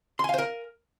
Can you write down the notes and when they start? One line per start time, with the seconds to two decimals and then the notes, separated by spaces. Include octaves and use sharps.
0.19 C6
0.24 G#5
0.29 F5
0.34 C5
0.38 A#4